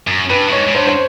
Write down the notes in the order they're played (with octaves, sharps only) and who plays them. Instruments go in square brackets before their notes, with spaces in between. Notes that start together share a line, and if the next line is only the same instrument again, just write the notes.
[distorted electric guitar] F#2
[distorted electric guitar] G2 [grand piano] B4
[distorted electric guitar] A2
[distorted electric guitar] G#2 [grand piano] C#5
[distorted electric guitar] G#2
[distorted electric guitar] G2 [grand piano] C5
[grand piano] C5